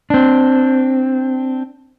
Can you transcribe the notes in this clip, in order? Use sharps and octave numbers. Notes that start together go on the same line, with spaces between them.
C4 D4